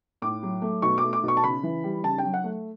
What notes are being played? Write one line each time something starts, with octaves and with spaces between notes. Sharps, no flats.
A2 D6
F#3
A3
B2 C#6
A3 D6
D6
B2 C#6
A5
C#3 B5
E3
G3
C#3 A5
F#3 G5
F#5
A3